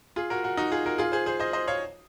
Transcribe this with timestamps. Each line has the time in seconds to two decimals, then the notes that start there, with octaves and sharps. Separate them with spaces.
0.16 F4 G#4
0.30 F#4 A#4
0.44 F#4 A#4
0.57 D#4 F#4
0.72 F4 G#4
0.86 F#4 A#4
0.98 F4 G#4
1.12 G#4 C5
1.26 G#4 C5
1.40 C5 D#5
1.53 C5 D#5
1.67 C#5 F5